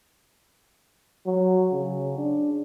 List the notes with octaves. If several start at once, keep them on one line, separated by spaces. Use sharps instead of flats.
F#3
C#3
D4